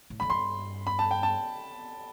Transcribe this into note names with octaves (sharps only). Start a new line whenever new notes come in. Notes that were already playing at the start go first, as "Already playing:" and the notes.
A2
F2 B5
G2 C6
B5
A5
G5
A5